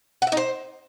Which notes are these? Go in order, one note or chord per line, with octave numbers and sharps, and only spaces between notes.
F#5
E5
D#4
C5